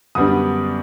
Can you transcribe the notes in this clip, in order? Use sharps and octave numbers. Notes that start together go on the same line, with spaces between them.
F#2 D3 G3 B3 D4 D#6